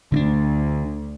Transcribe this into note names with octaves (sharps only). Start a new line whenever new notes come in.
D2 D3 C4 D4